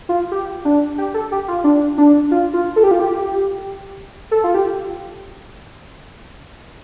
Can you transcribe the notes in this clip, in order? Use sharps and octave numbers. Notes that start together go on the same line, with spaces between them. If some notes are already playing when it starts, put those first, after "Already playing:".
F4
G4
D4
G4
A4
G4
F4
D4
D4
F4
F4
A4
G4
F4
G4
A4
F4
G4